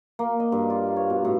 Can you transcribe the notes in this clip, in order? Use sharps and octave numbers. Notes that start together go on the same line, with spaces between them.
A#3
D#5
G2
F4
C#5
B2
A2